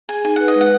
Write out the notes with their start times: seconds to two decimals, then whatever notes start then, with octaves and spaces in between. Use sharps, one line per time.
0.09 G#4 G#5
0.24 D#4 G#5
0.36 B4 F#5
0.48 D#5
0.55 G#3
0.61 F#5